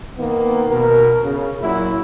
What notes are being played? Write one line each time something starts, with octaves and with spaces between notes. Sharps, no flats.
D#3 A#3 B3
B2 A#4
C#3
A#2 F#3 E4